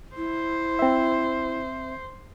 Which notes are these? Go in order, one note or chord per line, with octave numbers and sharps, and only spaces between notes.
E4 C5
C4 E5